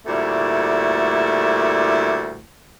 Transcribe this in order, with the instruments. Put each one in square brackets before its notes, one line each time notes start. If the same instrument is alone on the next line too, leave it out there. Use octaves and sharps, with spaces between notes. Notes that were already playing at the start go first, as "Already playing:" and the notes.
[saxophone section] D2 A#2 G3 A3 E4